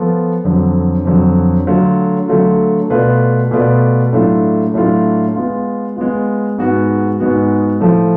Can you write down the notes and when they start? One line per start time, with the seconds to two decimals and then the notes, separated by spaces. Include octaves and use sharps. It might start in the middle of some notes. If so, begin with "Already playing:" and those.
Already playing: F3 B3 F4 A4
0.44 F2 D3 F#3
1.05 F2 D3 F#3
1.67 D3 F#3 A3 F4
2.28 D3 F#3 A3 F4
2.90 B2 A3 F4 B4 D5
3.51 B2 A3 F4 B4 D5
4.13 A2 F#3 A3 D4 F4
4.74 A2 F#3 A3 D4 F4
5.35 G#3 B3 F4
5.96 G#3 B3 F4
6.58 G#2 G#3 B3 F#4
7.20 G#2 G#3 B3 F#4
7.80 A2 F3 A3